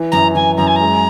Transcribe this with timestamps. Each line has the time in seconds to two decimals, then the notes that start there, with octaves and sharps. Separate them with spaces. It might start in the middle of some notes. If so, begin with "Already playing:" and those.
Already playing: E3
0.12 F#2 A#5
0.35 E3 G#5
0.57 F#2 A#5
0.67 G#5
0.76 G#3 A#5